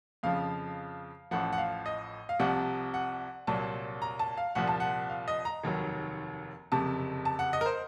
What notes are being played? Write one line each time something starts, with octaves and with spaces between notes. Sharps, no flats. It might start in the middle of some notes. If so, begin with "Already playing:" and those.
F2 C#3 F3 F5
A1 A2 F3 F#5
F#5
F5
D#5
F5
C2 C3 F3 F#5
F#5
C2 A#2 F#3 A5
A#5
A5
F5
C2 A#2 F3 F#5
A5
F#5
F5
D#5
A#5
F1 D#2 D#3 F#3
F#1 F2 C3 A5
A5
F#5
D#5
A#4
C5